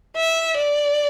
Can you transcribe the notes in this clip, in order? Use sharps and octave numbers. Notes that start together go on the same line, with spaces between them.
E5
D5